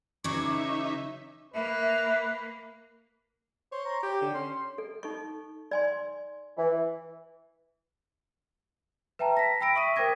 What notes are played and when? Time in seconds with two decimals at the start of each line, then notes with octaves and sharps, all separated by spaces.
0.24 C#3 E3 F#3 D#4 E5 C#6 D6
1.54 A#3 B4 E5
3.72 C5 C#5
3.86 A#5
4.03 G4 G5
4.21 D3
4.35 C#4 C6
4.78 A4
5.03 D#4 A4 C#6
5.71 D5 G#5 C6
6.57 E3
9.19 B4 E5 G5 A5 A#5
9.37 A#6 B6
9.61 G5 B5 E6 A#6 D7
9.75 E5 C#6 D#6 B6 D#7
9.96 A#4 C5 G5 D6 G#6 A#6